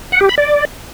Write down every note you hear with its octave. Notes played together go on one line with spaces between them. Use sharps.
F#5
G4
B5
D5